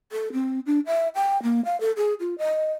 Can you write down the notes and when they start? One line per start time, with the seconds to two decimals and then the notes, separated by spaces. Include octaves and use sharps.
0.12 A4
0.33 C4
0.66 D4
0.86 E5
1.15 G5
1.43 A#3
1.65 F5
1.80 A4
1.97 G#4
2.20 F4
2.38 D#5